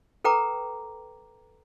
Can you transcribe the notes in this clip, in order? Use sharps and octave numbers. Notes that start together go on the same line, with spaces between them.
A4 B4 G5 A#5 D6